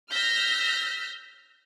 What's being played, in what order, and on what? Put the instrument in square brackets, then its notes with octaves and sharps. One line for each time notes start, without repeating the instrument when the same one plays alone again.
[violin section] E6 F6 G6 A#6 B6